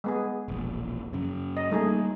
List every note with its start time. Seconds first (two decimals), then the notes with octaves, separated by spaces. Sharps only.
0.04 G#3 B3 G#4
0.48 E1 A#1
1.13 F#2 C#3
1.57 D#5
1.71 G3 A3 A#3 D#4 G#4